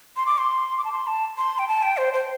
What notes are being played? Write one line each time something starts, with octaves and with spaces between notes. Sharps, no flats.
C6
D6
C6
D6
A5
C6
A5
C6
G5
A5
G5
C5
C5